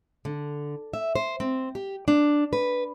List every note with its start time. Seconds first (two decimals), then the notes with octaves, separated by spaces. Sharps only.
0.25 D3
0.94 E5
1.15 C5
1.40 C4
1.75 G4
2.08 D4
2.53 B4